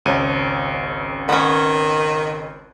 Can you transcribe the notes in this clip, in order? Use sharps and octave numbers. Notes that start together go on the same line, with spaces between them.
G#1 C#2 C5 C#5 A5 D#7
D#3 B3 C#4